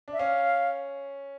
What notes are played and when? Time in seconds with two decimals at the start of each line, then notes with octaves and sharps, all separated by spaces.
0.08 D4
0.13 E5
0.19 C#4 F5